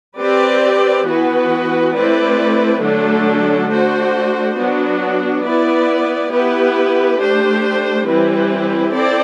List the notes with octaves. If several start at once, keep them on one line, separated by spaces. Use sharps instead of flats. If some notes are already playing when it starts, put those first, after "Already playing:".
C4 G4 B4 D5
E3 B3 F#4 B4
A3 C4 E4 B4 D5
D3 F#3 A3 D4 A4
A3 D4 F#4 C5
F#3 B3 D4 F#4
B3 E4 B4 D5
B3 E4 G4 B4
A3 D4 G4 C5
E3 G3 C4 E4 B4
C4 E4 A4 D5